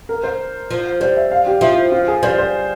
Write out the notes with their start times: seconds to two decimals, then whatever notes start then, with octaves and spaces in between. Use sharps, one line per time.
0.09 A#4
0.23 C5
0.70 F3
1.00 G3 C5
1.16 E5
1.31 F5
1.47 G4
1.61 F3 E4
1.72 F4
1.92 F4
2.08 G#4
2.23 G3 C5
2.38 C5